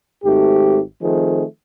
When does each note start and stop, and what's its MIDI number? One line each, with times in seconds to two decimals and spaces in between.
0.24 0.79 32
0.24 0.79 44
0.24 0.79 57
0.24 0.79 67
1.02 1.43 51
1.02 1.43 53
1.02 1.43 57
1.02 1.43 60
1.02 1.43 68